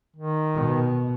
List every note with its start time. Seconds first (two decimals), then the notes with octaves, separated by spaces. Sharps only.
0.16 D#3
0.55 B2